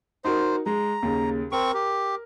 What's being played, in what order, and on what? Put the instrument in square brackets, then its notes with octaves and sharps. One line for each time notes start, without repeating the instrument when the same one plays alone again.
[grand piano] D#4 F#4 A#4 [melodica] C5
[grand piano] G#3 [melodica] A#5
[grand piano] D#2 C#3
[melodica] C4 C#6 [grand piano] A#4
[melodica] G4